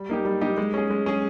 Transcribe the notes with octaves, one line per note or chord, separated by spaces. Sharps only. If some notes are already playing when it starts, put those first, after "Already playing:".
Already playing: G3
A#3 D#4 G4
G3
A#3 D#4 G4
G#3
C#4 G#4
G#3
C#4 G#4